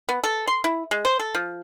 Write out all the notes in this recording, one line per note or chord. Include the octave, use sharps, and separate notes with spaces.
B3
A4
C6
E4
G#3
C5
A4
F3